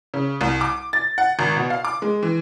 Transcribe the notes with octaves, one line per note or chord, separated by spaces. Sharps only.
C#3
C2
D6
A6
F#5
G#1
B2
F5
D6
G#3
E3